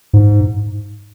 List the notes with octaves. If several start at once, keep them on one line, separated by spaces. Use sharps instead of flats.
G#2